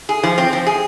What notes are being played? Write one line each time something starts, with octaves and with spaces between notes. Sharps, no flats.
G#4
F3
C4
F3
G#4